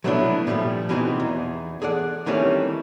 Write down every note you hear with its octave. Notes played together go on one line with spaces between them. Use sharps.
F#3 A3 B3 C4 D4 E4
A#2 F3 G3 A3
B2 E3 B3 C4 D#4 G#4
E2
G#4 A4 D5 F#5
D#3 E3 G3 A3 C4 C#4